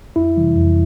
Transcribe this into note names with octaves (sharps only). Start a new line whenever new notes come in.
F2 E4
C3 E3 G3
F2